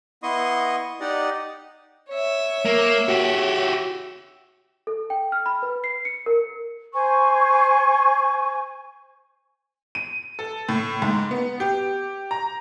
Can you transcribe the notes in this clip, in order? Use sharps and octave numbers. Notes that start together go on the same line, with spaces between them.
B3 E4 D#5 C6 C#6 D#6
D#4 G4 D5 D#5 F#5
C#5 E5
A#3
F#4 G4
A4
G5
F6
B5
B4
C7
C#7
A#4
C5 G#5 C#6
D#7
A4
A2
G#2
B3
G4
A#5